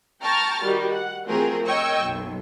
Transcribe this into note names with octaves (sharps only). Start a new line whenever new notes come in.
G5 A5 A#5 C#6 F6 A6
D#3 G3 F#4 G4
F#5
F3 A3 C4 F#4 G#4 A#4
A#4 C#5 D#5 G5 C#6 E6
B1 F#2